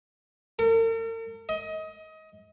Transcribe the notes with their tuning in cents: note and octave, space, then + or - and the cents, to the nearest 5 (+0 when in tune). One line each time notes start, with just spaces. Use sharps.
A#4 -45
D#5 +25